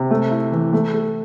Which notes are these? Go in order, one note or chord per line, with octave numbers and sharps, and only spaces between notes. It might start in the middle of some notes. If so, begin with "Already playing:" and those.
Already playing: C3
A3
E4
E3
A3
A4